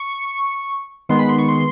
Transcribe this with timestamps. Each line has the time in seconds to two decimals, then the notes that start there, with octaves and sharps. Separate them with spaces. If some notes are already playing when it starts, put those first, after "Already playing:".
Already playing: C#6
1.09 D#3 G#3 B3 C6
1.19 B5
1.29 C6
1.38 C#6
1.48 C6